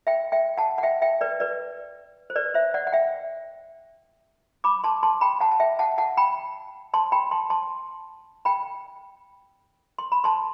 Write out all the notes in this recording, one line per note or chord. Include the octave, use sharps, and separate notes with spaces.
E5 G5
E5 G5
F#5 A5
F#5
E5 G5
E5 G5
B4 D5
B4 D5
C5
B4 D5
C5 E5
D5 F#5
F#5
E5 G5
B5 D6
A5 C6
A5 C6
G5 B5
F#5 A5
A5
E5 G5
F#5 A5
F#5 A5
G5 B5
A5 C6
G5 B5
A5 C6
A5 C6
G5 B5
C6
B5
A5 C6